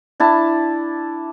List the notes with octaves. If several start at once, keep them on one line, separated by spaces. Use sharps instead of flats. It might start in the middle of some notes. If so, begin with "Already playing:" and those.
D4 E4 A5